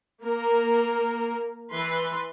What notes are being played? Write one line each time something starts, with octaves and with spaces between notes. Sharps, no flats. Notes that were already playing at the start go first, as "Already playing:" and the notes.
A#3 A#4
E3 B4 C6